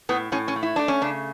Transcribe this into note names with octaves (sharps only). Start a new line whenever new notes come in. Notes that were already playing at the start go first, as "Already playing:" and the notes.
A2 B3
A2 C#4
C#4
A3
E4
A3 D4
C#4
C#3 D4